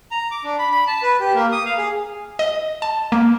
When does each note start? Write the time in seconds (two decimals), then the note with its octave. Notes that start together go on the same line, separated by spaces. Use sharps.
0.11 A#5
0.31 D6
0.44 D4
0.59 B5
0.72 B5
0.87 A5
1.02 B4
1.20 G4
1.34 A#3
1.52 D#6
1.66 F5
1.77 G#4
2.39 D#5
2.82 A5
3.12 A#3